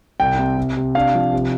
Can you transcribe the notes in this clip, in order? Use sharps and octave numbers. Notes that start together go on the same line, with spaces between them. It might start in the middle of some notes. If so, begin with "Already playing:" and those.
C2 G5
C3
C3
C3
D4 F5
F3
C3